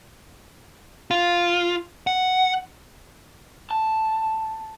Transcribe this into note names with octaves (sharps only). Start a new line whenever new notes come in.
F4
F#5
A5